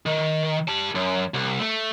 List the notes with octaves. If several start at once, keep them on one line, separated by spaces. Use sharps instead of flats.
D#3
G4 A5
F#2
C2
A3